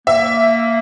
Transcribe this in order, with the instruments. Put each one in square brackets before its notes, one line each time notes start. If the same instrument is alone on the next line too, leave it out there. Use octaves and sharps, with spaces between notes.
[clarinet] A#3 [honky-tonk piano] E5